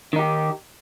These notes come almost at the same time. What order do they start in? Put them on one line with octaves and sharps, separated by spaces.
D#3 D#4 G4